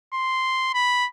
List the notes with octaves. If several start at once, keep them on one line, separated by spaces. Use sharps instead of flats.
C6
B5